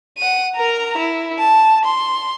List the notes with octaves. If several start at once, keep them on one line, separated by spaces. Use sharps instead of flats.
F#5 D#7
A#4 A#5
E4
A5
C6